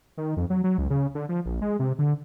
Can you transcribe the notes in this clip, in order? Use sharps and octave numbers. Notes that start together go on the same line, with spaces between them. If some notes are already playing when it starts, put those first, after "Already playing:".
D#3
F2
F#3
F#3
C#2
C#3
D3
F3
A#1
G#3
C3
D3